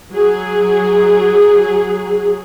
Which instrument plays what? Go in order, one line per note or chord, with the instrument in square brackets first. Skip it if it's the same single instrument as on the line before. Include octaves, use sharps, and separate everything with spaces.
[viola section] F#3 G#4